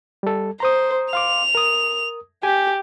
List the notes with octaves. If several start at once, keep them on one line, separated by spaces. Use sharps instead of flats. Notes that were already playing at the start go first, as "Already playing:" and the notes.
G3 A4
C5 A#5 C6 D#6
F5 C6 D6 F7
A#4 D#6
G4 G#5